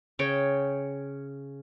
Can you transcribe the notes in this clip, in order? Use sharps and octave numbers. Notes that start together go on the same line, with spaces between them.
C#3 C#5 G5